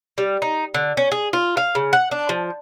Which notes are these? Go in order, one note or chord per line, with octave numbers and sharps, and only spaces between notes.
G3
D#4
D3
C#4
G#4
F4
F5
C#3
F#5
D4
F3